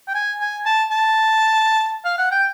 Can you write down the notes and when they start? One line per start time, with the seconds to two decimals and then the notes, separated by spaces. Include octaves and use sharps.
0.08 G5
0.15 G#5
0.40 G#5
0.66 A5
0.91 A5
2.05 F5
2.18 F#5
2.31 G5